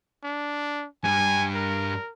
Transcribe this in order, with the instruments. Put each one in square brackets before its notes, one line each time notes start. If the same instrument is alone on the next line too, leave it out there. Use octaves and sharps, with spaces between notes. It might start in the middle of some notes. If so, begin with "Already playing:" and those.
[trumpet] D4
[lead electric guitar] G2 G3 [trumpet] G#5
[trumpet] A#4